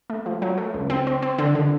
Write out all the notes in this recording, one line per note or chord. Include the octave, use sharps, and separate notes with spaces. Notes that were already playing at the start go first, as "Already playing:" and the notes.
A3
F3
F#3
A3
C#2
C4
C4
C4
D3
D3